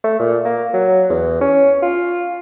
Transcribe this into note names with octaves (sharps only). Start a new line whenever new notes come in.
A3
A#2
A#3
F#3
E2
C#4
F4